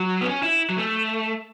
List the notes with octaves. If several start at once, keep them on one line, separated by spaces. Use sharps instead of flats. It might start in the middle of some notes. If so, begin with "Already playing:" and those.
Already playing: F#3
B3
C#4
E4
F#3
A3